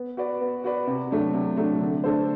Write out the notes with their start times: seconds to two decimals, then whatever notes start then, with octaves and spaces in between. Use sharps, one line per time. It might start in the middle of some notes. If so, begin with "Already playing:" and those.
Already playing: B3
0.17 F#4 B4 D5
0.41 B3
0.64 F#4 B4 D5
0.87 C3
1.11 F#3 A3 D4
1.33 C3
1.57 F#3 A3 D4
1.81 D3
2.04 A3 D4 A4 C5